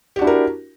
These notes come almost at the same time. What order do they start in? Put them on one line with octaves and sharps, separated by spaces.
G4 F#4 D4 E4 A#4